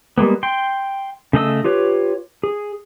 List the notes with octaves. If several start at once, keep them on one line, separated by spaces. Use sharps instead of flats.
G3 G#3 A#3 B3
G5 C6
C#3 A3 D#5 E6
F4 G4 B4 C#5
G#4